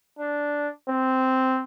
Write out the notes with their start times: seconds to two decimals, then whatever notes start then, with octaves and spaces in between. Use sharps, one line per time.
0.19 D4
0.90 C4